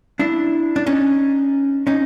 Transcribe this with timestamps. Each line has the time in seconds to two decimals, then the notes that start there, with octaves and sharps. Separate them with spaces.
0.19 D4 E4
0.76 D4
0.86 C#4 D#4
1.87 C#4 D#4